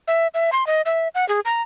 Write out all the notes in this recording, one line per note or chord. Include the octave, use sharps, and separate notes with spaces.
E5
E5
C6
D#5
E5
F#5
G#4
A#5